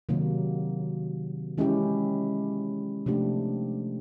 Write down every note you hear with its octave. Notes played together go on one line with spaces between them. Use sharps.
C3 D#3 F#3 A#3
E3 G#3 C#4 E4 G4
C3 F3 A3 D4 G4